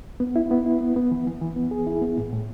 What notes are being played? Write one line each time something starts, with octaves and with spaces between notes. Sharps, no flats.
B3
E4
B3
E4
B3
B3
E3
E3
E3
B3
G#4
E4
B3
A2
A2